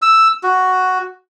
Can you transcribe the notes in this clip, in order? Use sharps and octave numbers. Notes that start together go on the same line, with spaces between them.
E6
F#4